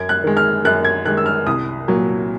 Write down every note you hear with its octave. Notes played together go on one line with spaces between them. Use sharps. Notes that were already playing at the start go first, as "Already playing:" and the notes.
Already playing: F#2 G#6
F#6
D#3 G#3
F6
F#2 F#6
G#6
D#3 G#3 F#6
E6
F6
C2 D#6
A#2 F#3